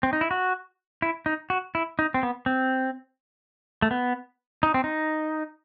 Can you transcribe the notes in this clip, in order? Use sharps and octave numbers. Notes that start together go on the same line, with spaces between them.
C4
D#4
E4
F#4
E4
D#4
F#4
E4
D#4
C4
B3
C4
A3
B3
D#4
C4
D#4